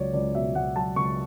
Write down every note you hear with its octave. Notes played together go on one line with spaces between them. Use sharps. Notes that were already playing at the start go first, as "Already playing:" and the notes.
Already playing: C#2 F#3 C#5 D5
C#2 D5
B2 E5
C#2 F#5
F#3 A5
C#2 C#6